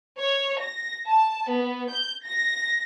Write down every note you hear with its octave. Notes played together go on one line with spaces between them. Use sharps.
C#5
A#6
A5
B3
G6
A#6